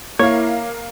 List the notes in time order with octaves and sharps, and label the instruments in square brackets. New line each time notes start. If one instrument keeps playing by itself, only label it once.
[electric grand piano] A#3 [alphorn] E4 [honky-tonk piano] A#4 F5 [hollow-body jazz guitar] C#5